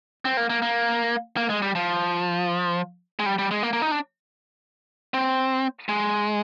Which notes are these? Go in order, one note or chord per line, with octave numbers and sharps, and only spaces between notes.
C4
A#3
A#3
A#3
A#3
G#3
G3
F3
G#3
G3
G3
G#3
A#3
A#3
D#4
D4
C4
G#3